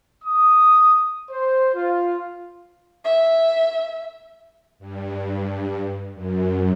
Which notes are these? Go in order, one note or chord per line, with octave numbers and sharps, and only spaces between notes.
D#6
C5
F4
E5
G2
F#2